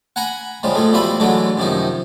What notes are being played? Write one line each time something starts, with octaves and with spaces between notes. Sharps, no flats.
F#5 G#5 A#5 B5
C#3 F3 G3 G#3
A2 F3 G#3 A3
B1 E3 G3 F4 E5 B5
D3 E3 F#3 G#3 A3
F#2 C3 D#3 F3 D#4